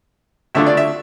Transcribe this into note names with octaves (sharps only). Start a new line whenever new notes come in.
D2 D3 A3 D4 F4 E5
D5
E5